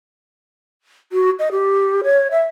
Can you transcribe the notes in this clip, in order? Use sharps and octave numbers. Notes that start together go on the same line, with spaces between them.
F#4
D#5
G4
C#5
E5